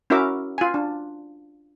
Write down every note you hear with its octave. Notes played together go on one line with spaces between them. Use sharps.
C#4 E4 F#4 A#4 E5 D6
F4 G#5
D4